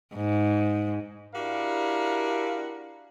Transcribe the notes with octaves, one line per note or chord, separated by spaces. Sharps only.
G#2
D4 E4 F#4 G4 A#4 F5